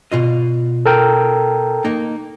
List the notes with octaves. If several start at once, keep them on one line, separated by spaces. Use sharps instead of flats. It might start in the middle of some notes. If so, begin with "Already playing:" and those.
B2 F4 D#5
A4 A#4 G5
A#3 D#4